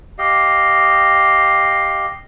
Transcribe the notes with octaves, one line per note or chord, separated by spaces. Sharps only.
G4 D#5 F5